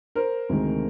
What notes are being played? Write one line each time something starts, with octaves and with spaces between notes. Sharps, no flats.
A#4 C5
D2 C3 D#3 G#3